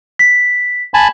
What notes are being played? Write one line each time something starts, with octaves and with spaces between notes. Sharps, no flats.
B6
G#5 A5 B5